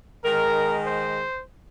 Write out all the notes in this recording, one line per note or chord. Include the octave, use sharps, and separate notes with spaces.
D#3 G#3 A#4
C5